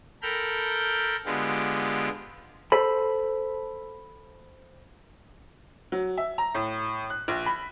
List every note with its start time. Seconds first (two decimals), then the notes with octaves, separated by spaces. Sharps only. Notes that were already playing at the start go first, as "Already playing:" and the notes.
0.22 A4 A#4 G5 B5 F6 G6
1.26 D3 G#3 B3 F4 G4
2.72 A4 C5 B5
5.92 F#3
6.18 E5
6.38 A#5
6.55 A2
7.10 F#6
7.28 A#1
7.46 B5